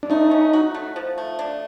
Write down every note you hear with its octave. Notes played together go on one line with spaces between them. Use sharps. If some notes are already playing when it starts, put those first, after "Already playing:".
D4
A3 D#4
C#4
F#4
A3
F3
A3
D4